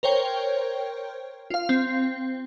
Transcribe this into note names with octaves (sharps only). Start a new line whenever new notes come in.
A#4 C5 C#5 G5
F4 F5
C4